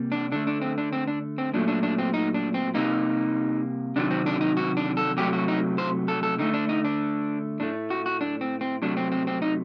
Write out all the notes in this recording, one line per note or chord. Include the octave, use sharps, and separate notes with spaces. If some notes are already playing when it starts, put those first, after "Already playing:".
Already playing: C3 G3 A#3
D4
D3 A3 D4
D4
C4
D4
C4
D4
C4
A#2 F#3 A3 D4
D4
D4
C4
D#4
D4
C4
C3 G3 A#3 D#4
C3 D#3 F#3 D4
C4
D4
D#4
F#4
D4
A4
C3 F#3 A3 G4
F#4
D#4
C5
A4
A4
D3 A3 D#4
D4
D#4
D4
A2 A3 D4
F#4
F#4
D4
C4
C4
C3 F#3 A3 D4
C4
C4
C4
D#4